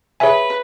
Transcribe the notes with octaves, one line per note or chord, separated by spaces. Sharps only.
G#4 B4 C#5 E5 G#5